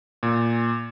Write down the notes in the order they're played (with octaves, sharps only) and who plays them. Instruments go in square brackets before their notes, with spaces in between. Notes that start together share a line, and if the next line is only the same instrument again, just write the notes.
[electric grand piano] A#2